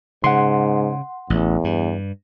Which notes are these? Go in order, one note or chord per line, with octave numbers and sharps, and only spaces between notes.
G#2 C#3 F#5 C6
A1 E2
G2